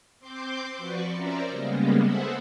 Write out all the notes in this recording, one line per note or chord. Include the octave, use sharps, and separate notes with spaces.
C4 C6 D6 G6
F3 F#4 B4 D5 C#6
C#4 A#4 C5 D5 E5 A#5
C#3 G3 G#3 A#3 B3
G#4 A4 B4 C5 E5 F#5